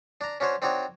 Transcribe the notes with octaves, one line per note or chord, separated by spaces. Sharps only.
D4 A#5
C#4 D4 F#4 C5 C#5
C4 D4 D#4 F#4 C#5